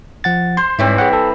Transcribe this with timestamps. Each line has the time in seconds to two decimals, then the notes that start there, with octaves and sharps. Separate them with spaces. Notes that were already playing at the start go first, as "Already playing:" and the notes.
0.24 F3 F#5 A6
0.57 C5 C6
0.79 G#2 E3 G3 C4 C#5
0.98 G#4 C#5 F#5
1.13 A4